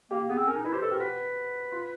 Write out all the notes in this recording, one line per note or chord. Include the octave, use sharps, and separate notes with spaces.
A#3 G4
B3 G#4
C4
C#4 A#4
D#4
E4 B4
G4 C5
A4 B4
G4 A#4
F#4 B4
F4